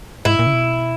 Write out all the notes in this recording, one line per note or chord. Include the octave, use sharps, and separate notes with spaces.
G#2 E4
A#2
C#3
B2